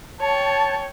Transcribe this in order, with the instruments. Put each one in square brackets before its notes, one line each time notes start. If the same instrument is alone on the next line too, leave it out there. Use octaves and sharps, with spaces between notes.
[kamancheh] C#5 G5 [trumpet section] A5